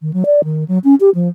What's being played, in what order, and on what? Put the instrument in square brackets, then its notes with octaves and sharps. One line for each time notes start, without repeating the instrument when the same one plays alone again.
[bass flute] D#3
F#3
D5
D#3
F#3
C#4
G4
F3